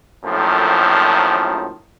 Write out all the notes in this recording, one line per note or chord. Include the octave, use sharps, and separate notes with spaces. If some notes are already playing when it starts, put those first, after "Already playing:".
A#1 F#2 A2 D#3 F3 A4